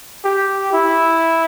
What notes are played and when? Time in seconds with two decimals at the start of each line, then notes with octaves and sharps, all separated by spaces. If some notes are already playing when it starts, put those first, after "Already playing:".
0.25 G4
0.73 E4